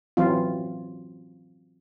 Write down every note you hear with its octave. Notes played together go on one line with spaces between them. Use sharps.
E3 F#3 C4 F4